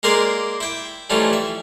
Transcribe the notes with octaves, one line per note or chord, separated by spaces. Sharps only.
G#3 A#3 A#4 C5 D5 D#6
E4 G5
E3 F3 G3 A3 C#4 D#4
E5